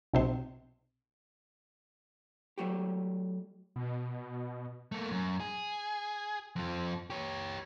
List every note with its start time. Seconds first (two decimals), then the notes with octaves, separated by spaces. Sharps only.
0.14 B1 C3 C5
2.58 F#3 A3 F#4 G4
3.76 B2
4.92 A3 A#3
5.11 F#2
5.40 G#4
6.56 F2 F3
7.10 G4 C#5